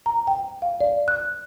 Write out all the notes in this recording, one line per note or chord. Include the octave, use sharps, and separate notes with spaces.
A#5
G5
F5
D5
F#6